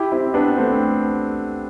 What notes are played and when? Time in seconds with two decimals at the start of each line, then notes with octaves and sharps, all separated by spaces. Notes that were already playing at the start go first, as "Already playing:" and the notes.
Already playing: E4 G4
0.12 C4 E4
0.34 B3 D4
0.57 A3 C4